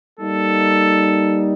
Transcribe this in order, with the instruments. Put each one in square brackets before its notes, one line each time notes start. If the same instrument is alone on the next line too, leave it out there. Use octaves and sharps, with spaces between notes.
[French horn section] G3 A#3 D#4 [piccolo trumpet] A4